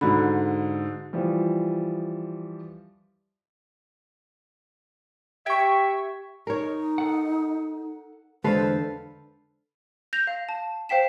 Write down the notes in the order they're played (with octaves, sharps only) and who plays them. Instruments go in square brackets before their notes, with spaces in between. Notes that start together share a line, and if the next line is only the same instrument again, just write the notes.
[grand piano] G#2 D3 [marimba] F#4 B5
[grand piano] E3 F3 G3
[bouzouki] G4 G5 [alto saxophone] E5 [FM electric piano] C#6 G#6
[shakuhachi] D#4 [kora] A#4 C#5
[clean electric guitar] A4 F#5
[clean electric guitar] E2 G#3 [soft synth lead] D3 [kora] A4 B4 F5 [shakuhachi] C5
[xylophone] G6 A#6 F7
F5
A5
C5 F5 G5 B6 E7